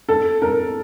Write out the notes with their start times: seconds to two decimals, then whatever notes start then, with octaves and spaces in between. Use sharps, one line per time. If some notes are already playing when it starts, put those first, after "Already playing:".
0.09 A4
0.42 A#4